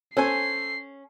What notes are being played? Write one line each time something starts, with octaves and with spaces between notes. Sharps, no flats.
C#4 A4 C5 G#5 C7